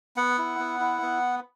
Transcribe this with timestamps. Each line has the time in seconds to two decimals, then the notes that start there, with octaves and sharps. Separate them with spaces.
0.16 B3 F#5
0.38 E4
0.59 B3
0.80 E4
1.02 B3